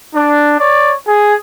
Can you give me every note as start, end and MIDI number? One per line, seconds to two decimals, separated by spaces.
0.15 0.57 62
0.60 0.95 73
0.60 0.95 74
1.08 1.36 68